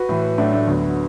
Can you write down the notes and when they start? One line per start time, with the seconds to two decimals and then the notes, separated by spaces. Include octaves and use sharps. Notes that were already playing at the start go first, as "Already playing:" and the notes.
Already playing: F#4 B4
0.09 A2 E3
0.38 A2 F#3 A3 D4
0.53 A3 D4
0.67 D2 D3 F#3 B3